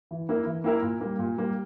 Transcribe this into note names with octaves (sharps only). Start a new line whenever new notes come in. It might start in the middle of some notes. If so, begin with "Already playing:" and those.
E3
A#3 E4 A#4
E3
A#3 E4 A#4
A#2
G3 A#3
A#2
G3 A#3